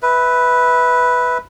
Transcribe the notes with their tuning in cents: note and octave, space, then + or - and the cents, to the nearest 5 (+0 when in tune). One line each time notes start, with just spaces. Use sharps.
B4 +0 E5 -20